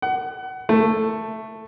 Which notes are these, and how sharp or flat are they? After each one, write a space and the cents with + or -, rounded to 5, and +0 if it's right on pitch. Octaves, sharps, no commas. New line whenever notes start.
F#5 +25
A3 +5